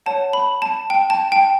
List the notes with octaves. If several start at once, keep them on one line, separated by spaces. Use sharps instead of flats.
C#5 F#5 A5
B5
A5
G5
A5
G5